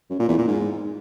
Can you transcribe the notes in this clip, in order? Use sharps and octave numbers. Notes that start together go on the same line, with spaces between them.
F#2
A#2
E2
A#2
G#2